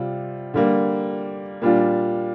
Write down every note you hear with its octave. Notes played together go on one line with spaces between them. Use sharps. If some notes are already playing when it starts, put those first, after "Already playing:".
Already playing: C3 G3 F4
D3 G3 A#3
A#2 G3 D4 F4